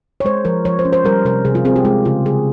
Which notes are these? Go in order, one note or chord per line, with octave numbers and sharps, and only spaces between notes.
C#5
G#3 C5
F3 A#4
F3 C#5
C5
C#4
C5
G3 A#4
C3 A#4
C3 G#4
F4
C4 G#4
G4
G#3 F4
C#3 F4
C#3 G#4